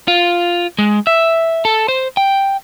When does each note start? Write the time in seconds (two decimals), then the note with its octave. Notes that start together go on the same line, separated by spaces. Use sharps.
0.08 F4
0.79 G#3
1.07 E5
1.65 A4
1.88 C5
2.17 G5